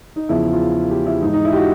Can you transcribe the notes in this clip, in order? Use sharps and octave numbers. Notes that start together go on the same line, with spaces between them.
D#4
E2 C#3 F3 E4
F4
G4
E4
G#2 E3 D#4
D#4
E4
G4
F#4